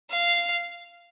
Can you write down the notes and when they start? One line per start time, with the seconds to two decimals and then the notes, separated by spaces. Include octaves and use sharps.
0.11 F5